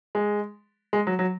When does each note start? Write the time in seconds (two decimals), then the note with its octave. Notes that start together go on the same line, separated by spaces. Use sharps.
0.15 G#3
0.93 G#3
1.07 F#3
1.19 F#3